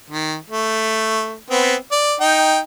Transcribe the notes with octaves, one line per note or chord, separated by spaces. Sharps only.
D#3
A3
B3 C4
D5
D#4 G5